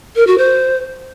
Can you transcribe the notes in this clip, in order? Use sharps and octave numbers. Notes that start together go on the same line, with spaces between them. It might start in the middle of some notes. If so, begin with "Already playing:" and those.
A#4
F#4
C5